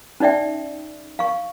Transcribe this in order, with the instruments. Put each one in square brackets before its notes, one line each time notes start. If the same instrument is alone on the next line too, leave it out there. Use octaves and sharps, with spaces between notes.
[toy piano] C#4 D#4 D5 E5 G5
F5 C#6